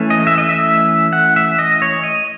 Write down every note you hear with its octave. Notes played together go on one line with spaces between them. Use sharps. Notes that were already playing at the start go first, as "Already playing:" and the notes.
Already playing: E3 A3 C#4
D#5
E5
D#5
E5
F#5
E5
D#5
C#5
D#5